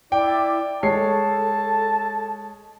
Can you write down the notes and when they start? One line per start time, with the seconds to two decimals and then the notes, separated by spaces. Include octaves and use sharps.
0.12 E4 D5 G5 D6
0.83 G#3 A4 C#5 A5 C7